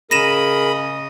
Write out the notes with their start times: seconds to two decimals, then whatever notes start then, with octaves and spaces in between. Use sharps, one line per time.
0.11 C#3 G#4 A#4 D#5 B5 A#6 D#7 E7